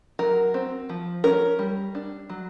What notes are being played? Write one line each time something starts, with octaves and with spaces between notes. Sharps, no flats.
F#3 A#4
C4
F3
C#4 A#4
G3
D4
F#3